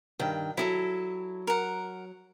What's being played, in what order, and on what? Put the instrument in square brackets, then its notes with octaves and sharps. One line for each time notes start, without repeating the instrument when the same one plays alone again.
[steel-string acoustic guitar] G2 D#3 [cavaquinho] G5
[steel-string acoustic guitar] F#3 [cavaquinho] E4 G#4 A4
[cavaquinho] A#4 F#5